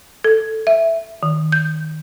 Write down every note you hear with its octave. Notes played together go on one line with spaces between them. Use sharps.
A4
E5
D#3
G6